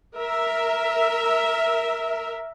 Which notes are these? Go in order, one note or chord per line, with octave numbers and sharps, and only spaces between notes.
A#4 E5